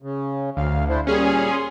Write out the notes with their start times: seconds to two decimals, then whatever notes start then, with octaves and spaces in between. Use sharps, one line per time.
0.02 C#3
0.57 D2 F5
0.89 D4 E4 C5
1.07 A#2 G3 C#4 G#4 F6
1.51 C6